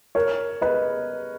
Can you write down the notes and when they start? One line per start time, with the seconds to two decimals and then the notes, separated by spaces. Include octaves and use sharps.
0.15 A#4 C#5
0.62 B4 D#5